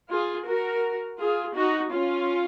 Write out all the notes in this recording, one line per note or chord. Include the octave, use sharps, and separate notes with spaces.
F4 G#4
F#4 A#4
F4 G#4
D#4 F#4
C#4 F4